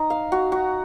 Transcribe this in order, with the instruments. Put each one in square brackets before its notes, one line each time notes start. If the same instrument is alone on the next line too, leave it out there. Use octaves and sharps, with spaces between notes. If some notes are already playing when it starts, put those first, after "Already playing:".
Already playing: [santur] D#4
F5
F#4
F#4